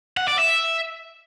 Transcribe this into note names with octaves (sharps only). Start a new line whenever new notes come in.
F#5
D5
E5